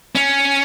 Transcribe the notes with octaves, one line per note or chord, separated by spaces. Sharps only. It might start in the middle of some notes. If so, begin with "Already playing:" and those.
C#4